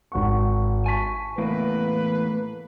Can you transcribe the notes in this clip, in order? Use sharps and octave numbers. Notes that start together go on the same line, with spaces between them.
G#1 F#5 C#6
G#5 A5 C#6 B6
E2 A2 A#3 B4